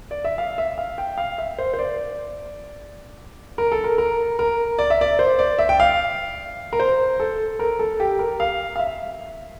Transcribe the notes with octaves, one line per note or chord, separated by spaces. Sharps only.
D5
E5
F5
E5
F5
G5
F5
E5
C5
C5
D5
A#4
A4
A#4
A#4
A#4
D5
E5
D5
C5
D5
E5
G5
F5
A#4
C5
A4
A#4
A4
G4
A#4
F5
F5
E5